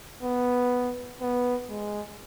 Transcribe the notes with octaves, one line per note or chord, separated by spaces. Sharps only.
B3
B3
G#3